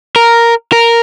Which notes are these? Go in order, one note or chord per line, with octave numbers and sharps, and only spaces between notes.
A#4
A#4